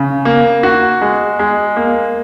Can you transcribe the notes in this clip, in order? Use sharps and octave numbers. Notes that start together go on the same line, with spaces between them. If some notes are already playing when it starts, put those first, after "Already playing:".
Already playing: C#3
A#3
F#4
G#3
G#3
A#3